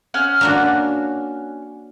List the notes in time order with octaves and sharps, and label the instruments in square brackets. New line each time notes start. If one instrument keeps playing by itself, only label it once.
[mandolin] C#4 F#5 F6
[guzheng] A#3 D4 F#4